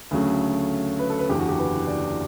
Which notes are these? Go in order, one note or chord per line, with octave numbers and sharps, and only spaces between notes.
D2 C#3 F#3 A3
B4
A4
B4
F#1 E2 D3 G4
F#4
G4
B4
D5